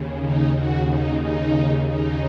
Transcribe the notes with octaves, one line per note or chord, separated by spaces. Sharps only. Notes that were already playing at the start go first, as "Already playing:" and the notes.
Already playing: D#2 C#3
D#4
D#2 C#3 F#4
D#4
D#4
D#2 C#3 D#4